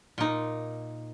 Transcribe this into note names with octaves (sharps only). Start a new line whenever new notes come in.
A#2 D#4